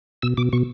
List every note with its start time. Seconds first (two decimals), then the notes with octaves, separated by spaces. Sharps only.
0.22 B2 E6
0.37 B2 D6
0.53 B2 C#6